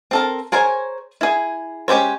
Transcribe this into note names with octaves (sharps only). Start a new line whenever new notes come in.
C4 A4 A#4
G#4 A#4 C5 C#5 G#5
E4 G#4
G#3 C#4 G4 C5 C#5